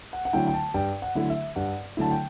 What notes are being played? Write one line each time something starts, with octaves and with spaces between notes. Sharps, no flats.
F#5
F#5
D3 F#3 A3 E4 G5
G5
A5
G2 G5
F#5
D3 F#3 A3 E4
E5
G2 F#5
D3 F#3 A3 E4 A5
G5